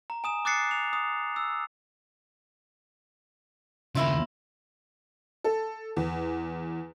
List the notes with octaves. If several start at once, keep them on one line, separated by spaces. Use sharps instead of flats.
A#5
G#5 D#6 E7
D6 D#6 F#6 A6 C7 C#7
F7
D#6
E6
D#2 C#3 A#3 E4 F4
A4
E2